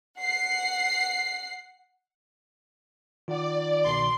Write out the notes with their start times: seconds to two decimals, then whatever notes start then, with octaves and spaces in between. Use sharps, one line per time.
0.18 F#5 C7
3.28 D#3 F4 D5 F#5
3.85 C2 B2 C6